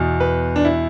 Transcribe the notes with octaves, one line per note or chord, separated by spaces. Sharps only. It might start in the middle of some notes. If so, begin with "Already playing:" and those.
Already playing: E2 B2
B4
D4
E4